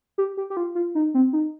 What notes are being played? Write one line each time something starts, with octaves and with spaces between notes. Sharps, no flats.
G4
G4
G4
F4
F4
D#4
C4
D#4